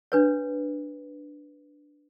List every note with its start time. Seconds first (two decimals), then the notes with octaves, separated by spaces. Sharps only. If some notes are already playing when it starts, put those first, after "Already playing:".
0.12 D4 B4 C#5